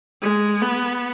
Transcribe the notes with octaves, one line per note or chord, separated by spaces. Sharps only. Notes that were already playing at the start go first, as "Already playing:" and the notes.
G#3
B3